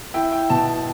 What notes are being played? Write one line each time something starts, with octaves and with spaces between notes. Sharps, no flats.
E4 G5
G5
B2 A5